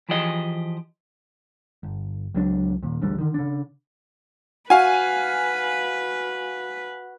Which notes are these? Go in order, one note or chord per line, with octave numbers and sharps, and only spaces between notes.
E3 F3 G4 G#4 D#5
G1
C#2 F#3 D4
D#2 A#2
A1 D2 D3 G3
D3 D#3
C#3 D4
F#4 B4 F5 G#5